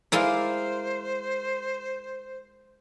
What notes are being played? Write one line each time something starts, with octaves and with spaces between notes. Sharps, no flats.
G#3 E4 A#4 C5 D5 F5